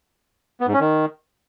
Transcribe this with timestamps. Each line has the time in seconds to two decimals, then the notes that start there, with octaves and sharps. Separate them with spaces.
0.61 B3
0.67 G#2
0.73 C#4
0.80 D#3